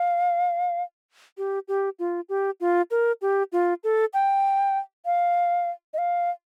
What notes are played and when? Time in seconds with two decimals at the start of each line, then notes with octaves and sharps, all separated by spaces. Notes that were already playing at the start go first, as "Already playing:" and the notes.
Already playing: F5
1.38 G4
1.68 G4
1.99 F4
2.29 G4
2.60 F4
2.91 A#4
3.22 G4
3.52 F4
3.84 A4
4.14 G5
5.06 F5
5.94 D#5
5.98 F5